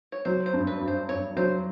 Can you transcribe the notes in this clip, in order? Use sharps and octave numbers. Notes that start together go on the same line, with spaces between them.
C#5
F#3 C5
C5
G2
B4
G2
C5
G2 C#5
F#3 C5